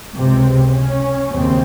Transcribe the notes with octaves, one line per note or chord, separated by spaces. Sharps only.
C#2 C3 C4
C#4
D#2 C#3 C4